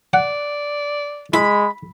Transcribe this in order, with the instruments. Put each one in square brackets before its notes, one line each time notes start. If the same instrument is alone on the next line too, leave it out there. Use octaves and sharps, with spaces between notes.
[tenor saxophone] D5 [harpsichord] F#5
[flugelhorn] G#3 [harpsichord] E4 [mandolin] B5